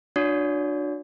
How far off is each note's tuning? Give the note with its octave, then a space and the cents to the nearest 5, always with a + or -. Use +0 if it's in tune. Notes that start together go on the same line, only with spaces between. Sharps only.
D4 +20 F#4 -40 C#5 +45